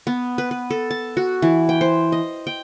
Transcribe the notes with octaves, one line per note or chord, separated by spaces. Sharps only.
B3
B4
B4
A4
A5
F#4
E3
G5
C5
D#5
G5